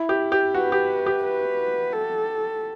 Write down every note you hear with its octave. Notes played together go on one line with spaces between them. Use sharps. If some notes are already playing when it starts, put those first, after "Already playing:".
Already playing: E4
G4
G4
F#4 B4
G4
G4
B4
A4